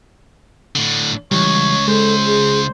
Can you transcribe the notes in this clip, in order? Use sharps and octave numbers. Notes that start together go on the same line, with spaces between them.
A2 D3
C#2 E3 G3 C#5
G#3 A4 C5
G#4